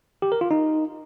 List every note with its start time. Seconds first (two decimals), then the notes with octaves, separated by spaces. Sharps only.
0.22 G4
0.32 A#4
0.41 F4
0.51 D#4